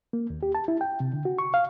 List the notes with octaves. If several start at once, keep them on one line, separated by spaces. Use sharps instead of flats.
A#3
D#2
G4
A5
E4
G5
C3
D3
F#4
C#6
F5